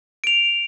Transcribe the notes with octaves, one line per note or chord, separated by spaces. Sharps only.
D7 F7